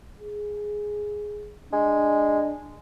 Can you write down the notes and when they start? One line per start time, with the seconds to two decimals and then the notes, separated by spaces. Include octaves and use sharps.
0.20 G#4
1.73 G#3 D4